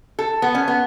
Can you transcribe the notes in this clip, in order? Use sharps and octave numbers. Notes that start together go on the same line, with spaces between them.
A4
B3
C#4
B3